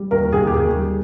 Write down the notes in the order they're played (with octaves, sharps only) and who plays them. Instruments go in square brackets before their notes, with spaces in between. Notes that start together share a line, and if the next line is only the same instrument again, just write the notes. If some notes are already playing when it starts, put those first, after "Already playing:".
Already playing: [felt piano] G3
D#2 A#4
D#2 G#4
G4
D#2 G#4
G3